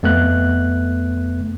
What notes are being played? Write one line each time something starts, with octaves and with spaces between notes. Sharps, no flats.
F2 A3 B3 F#6